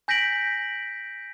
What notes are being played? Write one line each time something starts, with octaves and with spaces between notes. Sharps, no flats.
G#5 G6 A#6 B6 D7 F#7